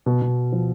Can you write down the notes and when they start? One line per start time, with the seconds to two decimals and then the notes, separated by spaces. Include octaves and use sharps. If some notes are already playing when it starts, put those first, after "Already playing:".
0.06 B2
0.22 B2
0.52 F3